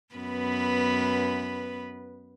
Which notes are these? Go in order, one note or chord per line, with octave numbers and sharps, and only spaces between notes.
F#2 B3 B4